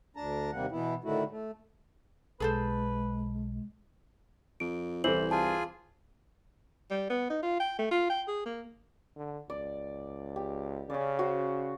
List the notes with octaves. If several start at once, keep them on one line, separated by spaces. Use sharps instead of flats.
D2 D4 A5 A#5
D#2 C3 G3 A#3 F#5
B2 E3 B3 E4
A2 D3 D#3 A3 E4 F#4
A3
B1 G#3 G#4 A4 B4 C5
F2 D7
C2 E3 A4 C5 F#7
F4 G#4 G#5 A5
G3
B3
D#4
F4
G5
A3
F4
G5
G#4
A#3
D3
C#2 D5
G4
C#3 C#4 D5
F#4 C5